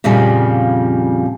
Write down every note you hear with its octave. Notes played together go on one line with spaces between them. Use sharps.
F2 A#2 C#3 F3 G3